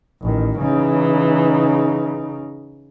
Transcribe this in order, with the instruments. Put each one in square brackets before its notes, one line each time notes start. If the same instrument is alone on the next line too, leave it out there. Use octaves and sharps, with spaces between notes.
[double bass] A1 D#3
[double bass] C#3 D#4 [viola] E3